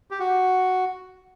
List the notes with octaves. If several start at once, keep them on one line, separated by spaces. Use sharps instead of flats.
G4
F#4